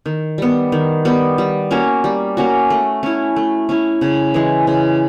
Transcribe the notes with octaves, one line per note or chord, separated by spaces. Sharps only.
D#3
G3 B3
D#3
G3 B3
G3
A#3 C#4 F#4
G3
A#3 C#4 F#4
A3
C#4 E4
A3
C#4 E4
C#3
E3 G#3
C#3